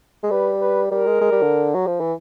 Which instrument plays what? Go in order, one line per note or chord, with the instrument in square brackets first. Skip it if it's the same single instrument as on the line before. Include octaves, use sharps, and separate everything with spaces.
[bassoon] G#3
[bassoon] G3 [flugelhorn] B4
[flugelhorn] B4
[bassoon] G3 [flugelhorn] A#4
[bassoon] G#3
G#3
G3
D3
F#3
F3
E3